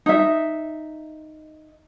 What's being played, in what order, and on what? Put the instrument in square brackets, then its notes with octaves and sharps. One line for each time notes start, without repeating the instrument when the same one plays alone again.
[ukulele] D#4 E5